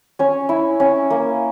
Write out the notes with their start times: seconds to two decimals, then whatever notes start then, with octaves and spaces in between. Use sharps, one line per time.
0.19 C#4 C#5
0.49 E4
0.80 C#4
1.10 A#3